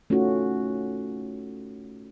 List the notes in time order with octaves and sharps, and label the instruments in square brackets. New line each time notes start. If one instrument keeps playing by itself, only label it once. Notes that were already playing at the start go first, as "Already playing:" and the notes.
[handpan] A3 C#4 D#4 F4 F#4